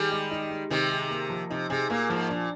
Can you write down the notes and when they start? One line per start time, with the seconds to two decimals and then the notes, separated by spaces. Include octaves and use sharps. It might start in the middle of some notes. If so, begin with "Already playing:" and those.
Already playing: D#3 G3 G#4
0.11 G#3
0.31 D#4
0.51 G#3
0.70 C3 D#3 D#4
0.91 G#4
1.10 A#3
1.30 F3
1.50 C3 D#4
1.70 C3 G#4
1.90 A#2 A#3
2.10 G#2 F3
2.29 A#2 D4